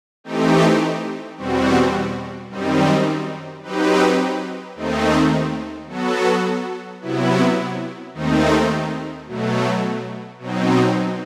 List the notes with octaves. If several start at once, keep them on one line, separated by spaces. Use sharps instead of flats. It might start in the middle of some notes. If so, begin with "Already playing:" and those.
E3 A3 C4 D#4 G4
E2 B2 G3 C4 F#4
F#2 D#3 G3 C4 D#4
F#3 C4 D#4 G4 B4
D#2 D#3 A3 C4 D#4
F#3 B3 F#4 A4
C3 F#3 B3 E4
D#2 D#3 A3 C4 D#4
B2 F#3 A3
B2 F#3 C4 D#4